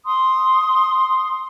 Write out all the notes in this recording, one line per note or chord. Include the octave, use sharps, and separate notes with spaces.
C6 D#6